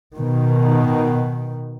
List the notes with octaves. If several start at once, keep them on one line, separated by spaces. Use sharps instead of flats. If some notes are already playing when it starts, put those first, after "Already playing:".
B2 D#3